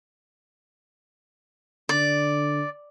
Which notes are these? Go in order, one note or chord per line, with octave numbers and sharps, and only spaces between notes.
D3 D5